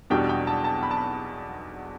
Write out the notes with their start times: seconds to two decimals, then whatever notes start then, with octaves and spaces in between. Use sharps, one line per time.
0.10 E2 B2 G3 D4 G5
0.29 G5
0.47 A5
0.64 A5
0.83 B5
0.91 A5
0.97 B5